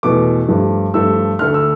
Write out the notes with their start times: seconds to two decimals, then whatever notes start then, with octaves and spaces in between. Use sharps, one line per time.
0.03 E2 B2 A3 D6
0.48 G2 F3 A3
0.94 G2 F3 A3 E6
1.39 D2 D3 A3 F6
1.54 E6